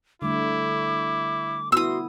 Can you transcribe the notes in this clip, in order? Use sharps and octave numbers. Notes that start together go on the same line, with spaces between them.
D3 G3 A3 E4 D6
B3 E4 F#4 C6 D#6 E6